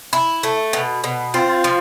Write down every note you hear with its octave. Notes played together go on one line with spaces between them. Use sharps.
E4
A3
B2
B2
C4 F4
F3